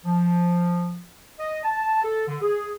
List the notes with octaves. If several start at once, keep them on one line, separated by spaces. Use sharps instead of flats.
F3
D#5
A5
A4
D3
G#4